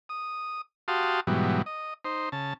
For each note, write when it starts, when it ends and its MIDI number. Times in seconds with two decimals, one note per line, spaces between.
0.09 0.61 87
0.88 1.20 66
0.88 1.20 67
0.88 1.20 77
0.88 1.20 81
0.88 1.20 84
0.88 1.20 87
1.27 1.62 44
1.27 1.62 47
1.27 1.62 52
1.27 1.62 54
1.27 1.62 55
1.66 1.94 75
2.05 2.29 63
2.05 2.29 72
2.32 2.54 49
2.32 2.54 81